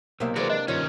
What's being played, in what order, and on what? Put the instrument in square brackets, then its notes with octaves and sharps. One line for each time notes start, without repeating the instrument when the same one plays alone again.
[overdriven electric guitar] B1 [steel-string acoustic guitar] C3 A#3 [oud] C5 E5 F5
[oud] E3 F#3 G#3 [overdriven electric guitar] F#4 D5 [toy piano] A#4 C5
[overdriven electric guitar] D4 [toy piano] D#5
[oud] G2 F4 C#5 [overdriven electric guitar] D#3 C#4